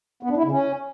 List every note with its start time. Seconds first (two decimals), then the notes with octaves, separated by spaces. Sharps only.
0.23 B3
0.30 D4
0.37 E4
0.44 C#3
0.51 C#4